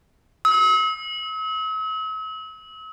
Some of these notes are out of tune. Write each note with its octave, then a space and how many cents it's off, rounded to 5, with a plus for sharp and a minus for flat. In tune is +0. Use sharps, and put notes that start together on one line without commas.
E6 -45